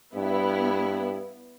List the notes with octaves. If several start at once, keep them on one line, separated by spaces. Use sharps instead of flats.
G2 B3 E4